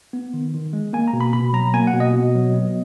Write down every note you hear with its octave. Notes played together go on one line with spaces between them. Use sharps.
B3
D#3
D#3
G#3
A#3 G#5
A#5
B2
B5
B2 B5
F#3 A#5
A#3 G#5
F#5
B2
D#5
B2
F#3
B3